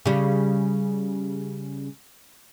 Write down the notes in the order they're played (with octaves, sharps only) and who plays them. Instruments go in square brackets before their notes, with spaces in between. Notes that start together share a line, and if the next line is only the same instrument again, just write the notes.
[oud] C#3 G3